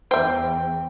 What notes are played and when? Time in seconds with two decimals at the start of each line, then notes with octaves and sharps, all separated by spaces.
0.11 E2 C5 E5 G5